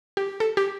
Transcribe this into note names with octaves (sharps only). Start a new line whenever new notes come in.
G4
A4
G4